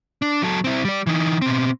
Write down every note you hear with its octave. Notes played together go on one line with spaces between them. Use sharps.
D4
F#3 A4
C4 E4
G3 D5
E3 D#4
B2 C4